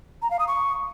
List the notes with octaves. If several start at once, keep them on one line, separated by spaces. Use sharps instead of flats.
A#5
F5
D#6
C#6